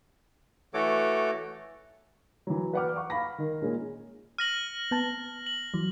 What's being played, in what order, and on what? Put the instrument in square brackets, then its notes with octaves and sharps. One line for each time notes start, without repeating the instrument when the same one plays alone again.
[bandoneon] E3 A3 F#4 A4 C#5 D6
[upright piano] E3 F#3
B4 D5 F#5 G5 D6 F6
F#5 C#6 D6
F5 B5 A#6
D#3
A#2 G#3 C#4 G#4
[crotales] F6 A#6 F#7 [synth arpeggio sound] D#7
[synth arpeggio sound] B3 A5
[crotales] F#7
[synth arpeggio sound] E3 F#3